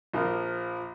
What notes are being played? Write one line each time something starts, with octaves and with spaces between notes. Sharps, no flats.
A#1 F3 A#4